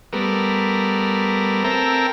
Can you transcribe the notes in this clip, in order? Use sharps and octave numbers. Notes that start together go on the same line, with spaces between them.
G3 A3 B3 A#4
C4 A4 A#4 E5 G5 A#5